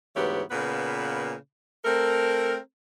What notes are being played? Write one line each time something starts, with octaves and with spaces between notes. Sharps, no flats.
D2 G#2 E3 B3 G4 C#5
A#2 C#3 B3 B4
A3 C4 A4 A#4